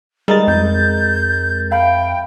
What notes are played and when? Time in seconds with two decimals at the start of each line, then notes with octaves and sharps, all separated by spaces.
0.28 G3 G#3 D#4 A#4 B4 D#5 A6
0.48 F2 G6
1.71 E5 F5 G5 B5